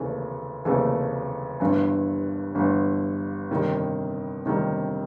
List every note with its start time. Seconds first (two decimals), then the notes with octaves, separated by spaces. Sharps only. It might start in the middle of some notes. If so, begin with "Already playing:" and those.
Already playing: F1 D#2 C#3 E3 A3
0.65 F1 D#2 C#3 E3 A3
1.60 G1 G2 E3
2.55 G1 G2 E3
3.50 G1 F2 C3 D#3 G3
4.45 G1 F2 C3 D#3 G3